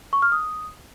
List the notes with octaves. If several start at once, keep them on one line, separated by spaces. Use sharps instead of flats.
C#6
F6
D#6